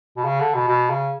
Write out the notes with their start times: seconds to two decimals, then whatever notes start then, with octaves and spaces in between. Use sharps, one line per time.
0.17 B2
0.24 C#3
0.40 D3
0.55 B2
0.68 B2
0.90 C#3